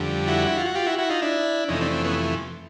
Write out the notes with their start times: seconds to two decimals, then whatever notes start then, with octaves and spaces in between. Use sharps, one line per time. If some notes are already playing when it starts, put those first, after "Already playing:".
Already playing: F2 D3 G3
0.28 E4 F#4
0.47 E4
0.57 F4
0.66 F#4
0.75 F4 G4
0.86 E4 F#4
0.98 E4 F#4
1.10 D#4 F4
1.22 D4 E4
1.68 F2 C3 E3 A3 C#4 D#4
1.81 C4 D4
1.92 C4
2.04 B3 C#4